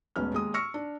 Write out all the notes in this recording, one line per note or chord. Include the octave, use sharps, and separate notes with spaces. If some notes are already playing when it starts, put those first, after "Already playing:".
E1 A1 B3 C#4 F6
D#2 G#3 D#6
C#6 E6 F6 A#6 C#7
D4